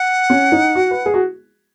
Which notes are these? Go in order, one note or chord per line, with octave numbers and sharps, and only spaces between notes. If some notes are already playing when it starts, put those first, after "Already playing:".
Already playing: F#5
C#4
D#4
F#4
B4
G#4
F#4